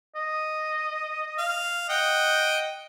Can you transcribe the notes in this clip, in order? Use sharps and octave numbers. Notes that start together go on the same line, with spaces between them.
D#5
F5
D#5 F#5 G5